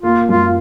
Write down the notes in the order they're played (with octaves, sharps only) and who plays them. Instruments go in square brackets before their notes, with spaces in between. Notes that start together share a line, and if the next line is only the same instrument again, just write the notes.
[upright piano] A#3 [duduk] F4
[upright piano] F#2 [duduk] F4